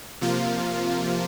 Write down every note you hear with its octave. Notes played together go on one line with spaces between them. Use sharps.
C3 F3 A#3 F4